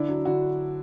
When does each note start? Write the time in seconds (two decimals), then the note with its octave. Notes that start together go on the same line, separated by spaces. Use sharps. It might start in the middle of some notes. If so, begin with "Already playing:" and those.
Already playing: D3 D4 E4
0.08 F#3
0.25 D3 E4 F#4